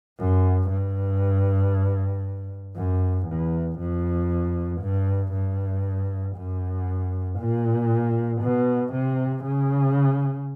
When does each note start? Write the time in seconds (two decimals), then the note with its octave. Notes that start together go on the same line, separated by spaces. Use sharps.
0.19 F#2
0.70 G2
2.76 F#2
3.27 E2
3.79 F2
4.81 G2
5.33 G2
6.36 F#2
7.39 A#2
8.42 B2
8.93 C3
9.44 C#3